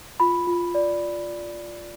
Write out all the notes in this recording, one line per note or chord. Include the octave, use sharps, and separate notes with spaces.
F4 B5
F4
D5